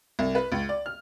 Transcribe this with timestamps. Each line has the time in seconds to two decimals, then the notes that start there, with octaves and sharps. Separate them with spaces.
0.19 C2
0.35 B4
0.52 C#2
0.69 D5
0.86 F6